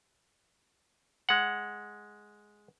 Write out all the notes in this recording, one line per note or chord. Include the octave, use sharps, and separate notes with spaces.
G#3 F#5